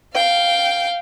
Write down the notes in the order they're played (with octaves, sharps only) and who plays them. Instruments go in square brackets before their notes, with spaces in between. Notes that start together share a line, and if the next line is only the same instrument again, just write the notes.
[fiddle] F5 G5